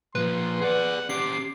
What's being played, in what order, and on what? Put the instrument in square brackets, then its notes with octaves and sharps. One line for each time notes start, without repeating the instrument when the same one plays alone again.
[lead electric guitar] A#2 F3 [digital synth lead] B4 [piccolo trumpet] C6
[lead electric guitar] G#4 D5 [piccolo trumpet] F#5
[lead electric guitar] C#4 G4 [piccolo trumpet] D6 [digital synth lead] C7